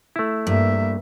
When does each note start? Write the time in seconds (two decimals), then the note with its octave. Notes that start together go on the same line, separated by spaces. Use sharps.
0.16 A3 E4
0.47 G2 A#3 E5